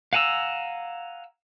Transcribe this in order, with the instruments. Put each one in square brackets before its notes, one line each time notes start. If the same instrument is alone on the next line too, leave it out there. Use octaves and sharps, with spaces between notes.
[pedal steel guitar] F5 F#5 G#5 A#5 E6